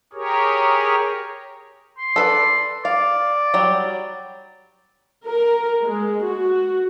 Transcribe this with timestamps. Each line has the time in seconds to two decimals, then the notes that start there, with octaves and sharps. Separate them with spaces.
0.13 G4 G#4 A#4 C#5
1.98 C6
2.16 A4 B4 D5
2.85 D5 F5
3.54 F#3 G3
5.26 A#4
5.83 G#3
6.24 F#4